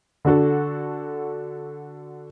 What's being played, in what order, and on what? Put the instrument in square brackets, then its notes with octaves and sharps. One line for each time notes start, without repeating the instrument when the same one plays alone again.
[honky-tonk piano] D3 D4 F#4 A4